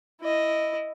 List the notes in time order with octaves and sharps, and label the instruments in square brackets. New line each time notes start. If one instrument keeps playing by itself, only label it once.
[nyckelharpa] E4 D#5